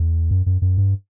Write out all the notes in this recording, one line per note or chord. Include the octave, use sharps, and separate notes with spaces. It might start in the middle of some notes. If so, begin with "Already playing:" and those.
Already playing: E2
F#2
F#2
F#2
G2